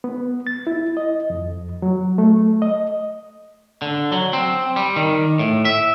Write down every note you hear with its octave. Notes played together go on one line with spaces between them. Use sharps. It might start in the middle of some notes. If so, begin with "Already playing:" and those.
B3
A6
E4
D#5
F2
F#3
A3
D#5
D3
F#3
C4
G3
D#3
A2
E5